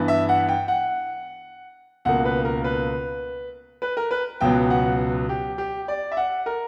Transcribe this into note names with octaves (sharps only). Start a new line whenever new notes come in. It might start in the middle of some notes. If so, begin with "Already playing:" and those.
Already playing: G2 E3 B3
E5
F#5
G5
F#5
C#2 B2 A#3 F#5
B4
A#4
B4
B4
A#4
B4
C#2 B2 F#3 B3 G5
F#5
G4
G4
D5
E5
F#5
A#4